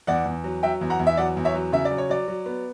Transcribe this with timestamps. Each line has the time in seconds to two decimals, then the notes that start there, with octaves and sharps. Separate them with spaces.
0.07 E2 D5 F#5
0.26 E2
0.44 F#3
0.63 F#3 E5 G5
0.81 E2
0.90 F#5 A#5
0.99 E2
1.07 E5
1.17 F#3 D5 F#5
1.37 E2
1.45 C#5 E5
1.54 F#3
1.73 C#3 E5
1.85 D5
1.91 F#3
1.98 C#5
2.09 F#3 D5
2.28 F#3
2.46 B3